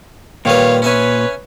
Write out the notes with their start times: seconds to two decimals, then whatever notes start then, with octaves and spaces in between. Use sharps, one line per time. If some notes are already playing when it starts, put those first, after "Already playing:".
0.45 A#2 D#3 G3 B4 C#5 F5
0.82 C#4 B4 C#5 E5 G#5